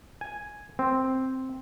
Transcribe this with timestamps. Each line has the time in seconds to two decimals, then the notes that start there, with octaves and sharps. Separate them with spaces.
0.21 G#5
0.79 C4